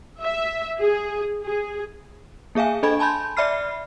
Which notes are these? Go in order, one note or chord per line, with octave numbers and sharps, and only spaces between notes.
E5
G#4
G#4
A#3 G#4 E5 F5 G#5
D4 A4 D#5 G#5 B5 G#6
G#5 A5 B5 C6 G6
D5 E5 B5 F6 C7